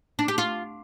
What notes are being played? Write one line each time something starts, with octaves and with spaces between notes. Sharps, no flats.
D4
G4
F4